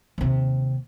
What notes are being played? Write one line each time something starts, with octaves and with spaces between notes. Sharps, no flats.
D#2 C3